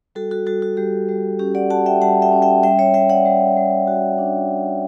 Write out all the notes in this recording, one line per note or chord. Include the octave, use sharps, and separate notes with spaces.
G3 F#4 A4
F#4 A4
G3 F#4 A4
F#4
G3 G4
G3
C#4 G4
D5 F#5
F#4 F#5 A5
E5 G5
G3 F#5 A5
E5 G5
C#4
E5 G5
G3 E5 G5
C#5 E5
G3 E5 G5
D5 F#5
G3
G3
F#4
D4